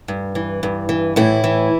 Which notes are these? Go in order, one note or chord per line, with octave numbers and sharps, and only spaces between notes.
G2
E3
G2
E3
A2 E3 E4
E3